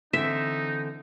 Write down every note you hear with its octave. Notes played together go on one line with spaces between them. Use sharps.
D3 E3 C4 D#4 E5